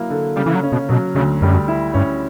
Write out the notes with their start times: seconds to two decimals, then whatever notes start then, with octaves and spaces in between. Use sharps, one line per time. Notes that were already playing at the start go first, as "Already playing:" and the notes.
Already playing: F#3 A#3 E4
0.10 D3
0.36 C#3 G3
0.46 E3
0.54 F#3
0.63 C#4
0.72 B2
0.89 B2 F#3
1.15 D2 C#3
1.42 F#2 G3
1.68 E4
1.94 G2 C#4